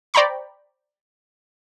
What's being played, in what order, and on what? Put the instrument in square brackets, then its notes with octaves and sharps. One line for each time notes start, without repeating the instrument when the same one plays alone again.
[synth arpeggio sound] C5 D5 G5 A#5 B5 C#6